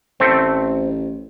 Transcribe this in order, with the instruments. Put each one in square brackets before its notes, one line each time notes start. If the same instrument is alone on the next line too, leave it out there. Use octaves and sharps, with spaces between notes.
[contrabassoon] A1 [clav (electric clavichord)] A3 C4